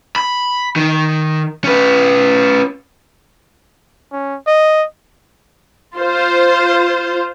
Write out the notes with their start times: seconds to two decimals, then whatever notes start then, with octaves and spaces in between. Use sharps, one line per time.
0.16 B5
0.76 D#3
1.64 C#4 B4
4.12 C#4
4.47 D#5
5.94 F4 C5